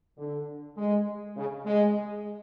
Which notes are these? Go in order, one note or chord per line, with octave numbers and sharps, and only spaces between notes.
D3
G#3
C#3
G#3